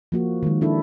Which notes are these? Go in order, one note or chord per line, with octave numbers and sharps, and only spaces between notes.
F3 A#3 F#4
D#3 G#3
D4 E4 A4